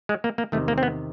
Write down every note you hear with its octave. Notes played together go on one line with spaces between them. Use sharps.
G#3
A#3
A#3
E2 C3 D#3 A3
A#3
C4
B3